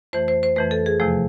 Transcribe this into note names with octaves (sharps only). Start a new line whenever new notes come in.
F2 E3 A3 C5
C5
C5
F2 E3 A3 B4
A4
G#4
E2 C3 F3 A3